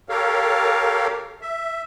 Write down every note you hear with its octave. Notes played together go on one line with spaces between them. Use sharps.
G4 A4 A#4 C#5 F5
E5